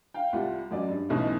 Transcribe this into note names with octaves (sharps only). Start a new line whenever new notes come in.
F5 G5
C2 G3 F4 F#5
F#2 F#3 D5 D#5
G2
B1 B2 E3 A3 C#4 D#4